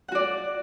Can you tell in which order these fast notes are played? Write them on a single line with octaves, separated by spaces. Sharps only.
F#5 F#4 D5